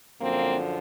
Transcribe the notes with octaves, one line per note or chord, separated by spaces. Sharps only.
F#2 D3 F3 A#3 C4